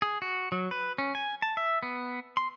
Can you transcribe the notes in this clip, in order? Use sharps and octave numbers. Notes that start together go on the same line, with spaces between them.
G#4
F#4
F#3
B4
C#4
G#5
A5
E5
B3
C6